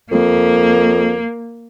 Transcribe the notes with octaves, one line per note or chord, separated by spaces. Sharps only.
F2 A#3